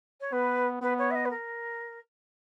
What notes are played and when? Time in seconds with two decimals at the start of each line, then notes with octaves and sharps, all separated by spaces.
0.20 C#5
0.32 B3 B4
0.81 B3 B4
0.98 C#5
1.11 E5
1.15 D#5
1.25 B4
1.30 A#4